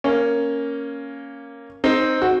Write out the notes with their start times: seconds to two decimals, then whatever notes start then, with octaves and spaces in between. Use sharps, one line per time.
0.04 A#3 C#4
1.84 C4 D#4
2.22 F#4